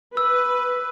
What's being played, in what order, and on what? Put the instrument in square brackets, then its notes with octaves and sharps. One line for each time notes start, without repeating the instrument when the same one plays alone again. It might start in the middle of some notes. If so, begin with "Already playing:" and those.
[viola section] B4 [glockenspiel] E6